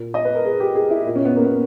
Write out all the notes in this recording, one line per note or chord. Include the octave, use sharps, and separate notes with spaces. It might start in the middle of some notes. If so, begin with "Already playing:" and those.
Already playing: A#2
D#5
B4
A#4
G#4
G4
G#4
E4
A#2
C#4
B3
A#3
B3